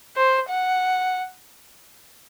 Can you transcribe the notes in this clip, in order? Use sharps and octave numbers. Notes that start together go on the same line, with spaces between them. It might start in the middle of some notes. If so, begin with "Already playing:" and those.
C5
F#5